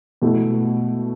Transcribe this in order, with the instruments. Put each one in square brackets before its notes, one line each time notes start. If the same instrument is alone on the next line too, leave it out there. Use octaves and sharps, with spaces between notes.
[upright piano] B2 A3 E4